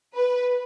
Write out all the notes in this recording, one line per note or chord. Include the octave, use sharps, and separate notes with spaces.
B4